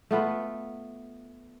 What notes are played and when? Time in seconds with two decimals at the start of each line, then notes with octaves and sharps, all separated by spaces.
0.11 A3 B3 F4 B4